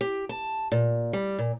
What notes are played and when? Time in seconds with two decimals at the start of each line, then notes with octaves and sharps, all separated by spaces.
0.01 G4
0.29 A5
0.72 A#2
1.13 G3
1.39 A#2